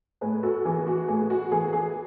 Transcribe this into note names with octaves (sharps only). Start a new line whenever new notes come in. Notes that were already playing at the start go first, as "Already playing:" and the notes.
A2 G#4 B4
F#4 A4
E3 G#4
F#4
A2 G#4
F#4
E3 G#4
G#4